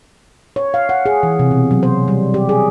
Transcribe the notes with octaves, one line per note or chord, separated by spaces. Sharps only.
C#5
F5
F#5
G#4
E3
C3
B2
F#3
C5
G3
G4
G#4